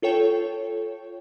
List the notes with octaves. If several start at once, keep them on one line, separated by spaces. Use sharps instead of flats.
F4 A4 C#5 G5